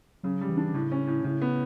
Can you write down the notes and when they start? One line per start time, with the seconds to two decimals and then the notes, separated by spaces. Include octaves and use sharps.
0.23 C#3 F#3
0.41 G3
0.49 E3
0.57 D4
0.74 A2 C#3
0.91 C#4
1.07 A2
1.24 A2 C#3
1.41 B3